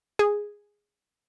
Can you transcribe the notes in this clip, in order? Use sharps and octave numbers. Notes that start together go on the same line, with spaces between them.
G#4